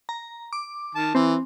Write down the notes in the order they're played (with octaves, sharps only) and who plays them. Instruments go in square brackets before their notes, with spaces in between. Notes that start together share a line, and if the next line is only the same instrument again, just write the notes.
[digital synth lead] A#5
D6
[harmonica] D#3 A5
[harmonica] E3 [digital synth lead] C4